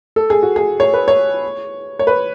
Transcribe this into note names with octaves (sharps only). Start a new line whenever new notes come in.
A4
G#4
F#4
G#4
C#5
B4
C#5
C#5
B4